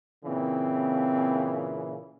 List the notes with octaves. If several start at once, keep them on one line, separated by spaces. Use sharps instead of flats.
A#2 C#3 E3 C4